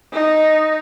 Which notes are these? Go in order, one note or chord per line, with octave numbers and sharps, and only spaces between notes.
D#4